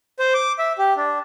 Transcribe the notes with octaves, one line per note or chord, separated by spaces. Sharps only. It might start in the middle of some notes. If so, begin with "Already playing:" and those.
C5
D6
E5
G4
D4